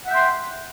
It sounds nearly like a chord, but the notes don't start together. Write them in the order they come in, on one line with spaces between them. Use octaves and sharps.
F#5 E5 G5 C6